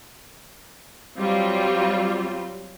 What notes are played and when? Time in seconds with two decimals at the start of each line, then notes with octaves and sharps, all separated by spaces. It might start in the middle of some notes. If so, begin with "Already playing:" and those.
1.18 F#3 G3 C4 F4